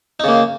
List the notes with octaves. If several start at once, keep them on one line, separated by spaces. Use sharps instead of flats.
C#3 A#3 D#4